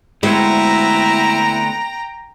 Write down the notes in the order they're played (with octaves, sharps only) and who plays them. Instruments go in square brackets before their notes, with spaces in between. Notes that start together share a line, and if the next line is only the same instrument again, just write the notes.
[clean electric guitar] D2 B3 C4 [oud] G#3 [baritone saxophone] E4 [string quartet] G5 A#5